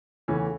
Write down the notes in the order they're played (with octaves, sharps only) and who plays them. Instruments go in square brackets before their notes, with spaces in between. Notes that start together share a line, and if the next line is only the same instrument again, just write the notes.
[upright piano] E2 C#3 E3 A3 C#4